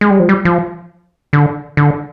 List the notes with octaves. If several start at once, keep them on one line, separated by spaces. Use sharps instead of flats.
G#3
G3
F3
G3
F3
D3
D3